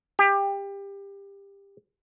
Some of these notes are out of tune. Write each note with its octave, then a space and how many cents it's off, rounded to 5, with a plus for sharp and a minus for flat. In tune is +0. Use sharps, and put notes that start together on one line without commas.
G4 +20